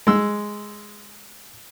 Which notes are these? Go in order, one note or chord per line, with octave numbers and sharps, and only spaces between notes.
G#3 E6